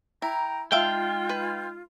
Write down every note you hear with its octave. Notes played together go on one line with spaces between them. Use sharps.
E4 G5 A#5
G#3 D#4 F4 E5 F5 G5 A5
B4